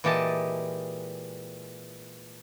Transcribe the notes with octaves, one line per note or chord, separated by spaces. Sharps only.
A#2 E3 G#3 G4 D#5 A5